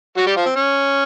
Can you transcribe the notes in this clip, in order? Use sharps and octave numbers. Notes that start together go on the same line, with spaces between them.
F#3 F#4
G3 G4
F3 F4
C4
C#4